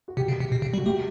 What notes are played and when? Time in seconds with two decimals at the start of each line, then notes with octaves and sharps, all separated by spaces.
0.08 F#4
0.17 C3 G4
0.28 C#3
0.40 C3
0.52 B2
0.62 C#3
0.74 G3
0.78 F#4
0.86 A3 G4